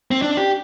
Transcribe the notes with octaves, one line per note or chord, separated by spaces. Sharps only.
C4
D4
G4